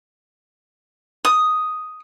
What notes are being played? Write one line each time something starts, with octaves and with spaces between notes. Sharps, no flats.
D#6